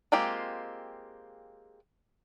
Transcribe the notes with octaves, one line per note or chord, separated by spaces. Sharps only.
G#3 A#3 C4 F4 G4